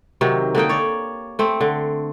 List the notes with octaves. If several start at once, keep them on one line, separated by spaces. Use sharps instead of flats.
C3 D#3 F#3
D3 A#3 D#4 G5
C#5 D5
A3 C4
D3